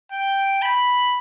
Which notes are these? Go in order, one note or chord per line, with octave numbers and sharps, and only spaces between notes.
G5
B5